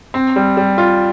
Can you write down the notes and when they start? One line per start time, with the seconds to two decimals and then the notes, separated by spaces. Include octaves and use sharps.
0.14 C4
0.36 G3
0.57 G3
0.78 F4